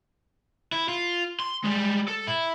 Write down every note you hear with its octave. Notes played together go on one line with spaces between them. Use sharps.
E4
F4
C6
G3 G#3
A4
E4